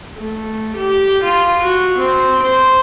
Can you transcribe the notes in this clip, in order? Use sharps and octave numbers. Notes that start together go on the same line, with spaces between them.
A3
G4
F4
F#4
C4
C5